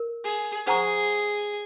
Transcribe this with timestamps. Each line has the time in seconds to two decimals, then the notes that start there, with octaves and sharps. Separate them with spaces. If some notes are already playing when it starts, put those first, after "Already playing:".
Already playing: A#4
0.25 G#4
0.67 G#4 C5 F#5 A#5 C#6